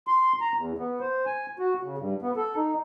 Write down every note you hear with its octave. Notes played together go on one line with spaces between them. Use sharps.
C6
A#5
E2
B3
C5
G#5
F#4
C#3
G2
B3
A4
D#4